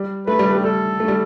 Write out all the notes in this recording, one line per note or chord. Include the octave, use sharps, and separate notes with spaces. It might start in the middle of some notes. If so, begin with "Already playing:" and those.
Already playing: G3
A3 B4
G3
A3
G4
G3 A4
A3
G3